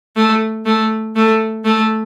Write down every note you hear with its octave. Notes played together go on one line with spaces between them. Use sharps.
A3
A3
A3
A3